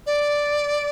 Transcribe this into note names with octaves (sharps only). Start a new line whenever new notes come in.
D5